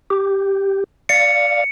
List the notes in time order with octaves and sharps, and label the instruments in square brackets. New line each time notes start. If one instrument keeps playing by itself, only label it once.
[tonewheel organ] G4
[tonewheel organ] D5 F5 [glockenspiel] C#7